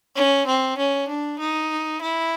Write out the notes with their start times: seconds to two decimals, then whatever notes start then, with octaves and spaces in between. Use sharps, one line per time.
0.16 C#4
0.47 C4
0.78 C#4
1.08 D4
1.39 D#4
2.02 E4